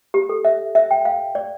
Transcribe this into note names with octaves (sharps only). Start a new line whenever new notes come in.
G4
A4
E5
E5
G5
F5
D5